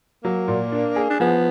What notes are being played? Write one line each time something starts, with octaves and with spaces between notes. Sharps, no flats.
F#3 A#3
A#2
D4
G#4
D4
F3 B3